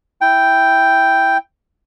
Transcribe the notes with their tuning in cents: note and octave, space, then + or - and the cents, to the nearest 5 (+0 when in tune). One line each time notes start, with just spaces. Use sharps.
E4 +0 G5 +0